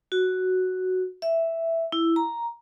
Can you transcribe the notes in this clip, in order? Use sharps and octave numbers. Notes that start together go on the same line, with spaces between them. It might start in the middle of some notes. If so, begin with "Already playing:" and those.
F#4
E5
E4
A#5